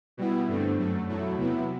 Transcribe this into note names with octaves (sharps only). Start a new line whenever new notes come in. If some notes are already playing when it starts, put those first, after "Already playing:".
B2 G3 B3 E4
G2 D3 A3 C4
F#2 F#3 A3
E2 B2 F#3 A3 E4
C3 F#3 B3 E4